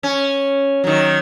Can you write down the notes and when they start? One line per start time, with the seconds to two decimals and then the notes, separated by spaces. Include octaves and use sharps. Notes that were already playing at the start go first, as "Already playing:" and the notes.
0.03 C#4
0.84 D#3 F#3